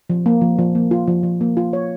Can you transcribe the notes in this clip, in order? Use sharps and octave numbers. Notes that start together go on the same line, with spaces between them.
F3
A#3
F3
F3
A#3
F4
F3
F3
A#3
F4
C#5